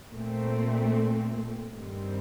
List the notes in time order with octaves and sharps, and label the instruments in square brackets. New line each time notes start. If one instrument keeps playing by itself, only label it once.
[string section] A#2 A3 C4
G2 D#3 G3 C4